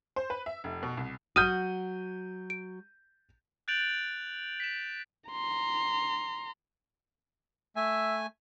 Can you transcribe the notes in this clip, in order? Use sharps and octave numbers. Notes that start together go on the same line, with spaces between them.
C5
B4
E5
F1
B2
C2
F#3 F#4 D#6 F6 G6 D#7
D7
F#6 G6 A6 D7 F7 F#7
B6 E7
A#5 C6
A3 E5 G#5